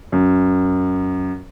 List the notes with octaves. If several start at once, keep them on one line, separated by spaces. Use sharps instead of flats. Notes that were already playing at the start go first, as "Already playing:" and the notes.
F#2